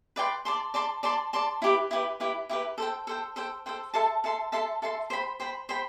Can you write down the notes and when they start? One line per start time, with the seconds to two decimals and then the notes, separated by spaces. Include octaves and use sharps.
0.16 B4 D5 G5 C6
0.45 D5 A5 C6
0.74 D5 A5 C6
1.03 D5 A5 C6
1.33 D5 A5 C6
1.62 E4 G4 B4
1.91 E4 G4 B4
2.20 E4 G4 B4
2.49 E4 G4 B4
2.78 A4 C5 G5
3.07 A4 C5 G5
3.36 A4 C5 G5
3.66 A4 C5 G5
3.94 A4 E5 A5 C6
4.24 A4 E5 A5 C6
4.52 A4 E5 A5 C6
4.82 A4 E5 A5 C6
5.10 C5 G5 B5
5.40 C5 G5 B5
5.69 C5 G5 B5